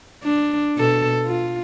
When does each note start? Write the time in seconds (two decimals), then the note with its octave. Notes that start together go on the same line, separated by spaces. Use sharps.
0.24 D4
0.77 B2 A4
1.25 F4